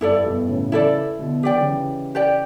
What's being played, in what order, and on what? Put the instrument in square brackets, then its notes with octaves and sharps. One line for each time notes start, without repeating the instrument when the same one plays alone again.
[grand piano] G2 [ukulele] E4 A4 D5
[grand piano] G2 B2
A2 C#3
[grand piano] C#3 E3 [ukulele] E4 A4 D5
[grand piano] B2 D3
[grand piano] E3 [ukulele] G4 D5 G5
[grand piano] D3
C#3 E3
[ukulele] G4 D5 G5